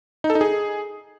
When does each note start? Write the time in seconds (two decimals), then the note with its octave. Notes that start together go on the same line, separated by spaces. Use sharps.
0.24 D#4
0.30 A4
0.35 D#4
0.41 G#4